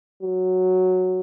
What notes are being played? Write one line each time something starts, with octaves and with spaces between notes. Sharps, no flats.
F#3